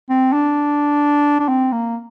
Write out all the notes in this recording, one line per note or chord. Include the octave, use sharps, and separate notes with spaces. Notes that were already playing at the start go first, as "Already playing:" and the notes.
C4
D4
D4
C4
A#3